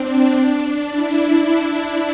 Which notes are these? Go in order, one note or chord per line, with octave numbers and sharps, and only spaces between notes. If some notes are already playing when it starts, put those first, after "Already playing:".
Already playing: C4 D4
D4
E4